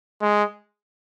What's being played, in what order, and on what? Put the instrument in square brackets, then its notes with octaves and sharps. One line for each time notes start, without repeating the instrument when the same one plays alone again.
[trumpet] G#3